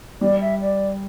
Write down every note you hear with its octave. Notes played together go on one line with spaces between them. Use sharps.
G3 D5
E5
D5